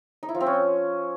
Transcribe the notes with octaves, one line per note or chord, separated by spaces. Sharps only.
D#4
E4
F3
C4
C#4